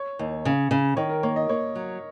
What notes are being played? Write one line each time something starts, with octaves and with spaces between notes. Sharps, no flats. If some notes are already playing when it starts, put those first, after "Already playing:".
Already playing: C#5
D#2
C#3
C#3
D#3 C#5
A#4
A#3 C#5
D#5
A#3 C#5
F#3